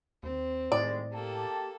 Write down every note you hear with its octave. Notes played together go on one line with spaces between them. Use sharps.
D#2 C4
A2 D#3 G3 G#3 D5
A#3 G4 A4 A5